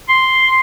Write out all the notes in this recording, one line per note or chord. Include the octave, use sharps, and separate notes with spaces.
C6